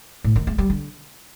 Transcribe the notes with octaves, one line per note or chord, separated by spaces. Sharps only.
A2
D#3
G#3
G3
D3